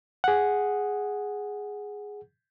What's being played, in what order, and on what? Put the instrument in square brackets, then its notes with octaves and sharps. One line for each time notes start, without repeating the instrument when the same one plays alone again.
[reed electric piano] G#4 F#5